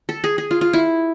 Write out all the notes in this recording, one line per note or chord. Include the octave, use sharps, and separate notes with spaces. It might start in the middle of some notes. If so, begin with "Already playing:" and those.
A4
G#4
G#4
F4
F4
E4